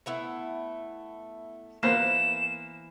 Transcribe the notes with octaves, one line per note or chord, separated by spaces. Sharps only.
A3 B3 E4
E3 A#3 B3 C5 E7